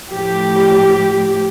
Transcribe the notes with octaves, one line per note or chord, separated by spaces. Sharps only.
A2 F3 G4